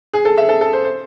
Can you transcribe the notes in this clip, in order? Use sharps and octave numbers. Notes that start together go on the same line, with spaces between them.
G#4
A4
E5
A4
A4
C5
C5